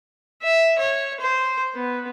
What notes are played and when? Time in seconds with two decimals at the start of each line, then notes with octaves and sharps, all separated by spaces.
0.43 E5
0.79 C#5
1.21 C5
1.75 B3